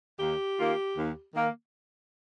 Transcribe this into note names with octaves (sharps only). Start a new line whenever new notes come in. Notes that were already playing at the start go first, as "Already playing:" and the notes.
D#2 G4
D#3 A#3 F4
D#2
D#3 A#3